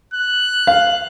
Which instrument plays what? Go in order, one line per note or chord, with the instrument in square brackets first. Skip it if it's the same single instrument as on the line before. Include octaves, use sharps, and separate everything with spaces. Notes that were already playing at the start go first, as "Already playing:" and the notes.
[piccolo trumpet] F#6
[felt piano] F5